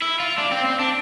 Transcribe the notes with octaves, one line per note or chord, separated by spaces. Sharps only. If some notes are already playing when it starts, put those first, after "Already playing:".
E4
F4
D4
C4
C4
D4